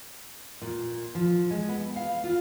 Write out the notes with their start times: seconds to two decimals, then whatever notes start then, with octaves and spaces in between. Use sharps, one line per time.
0.62 A#2
1.15 F3
1.51 G#3
1.69 B3
1.96 F5
2.24 F4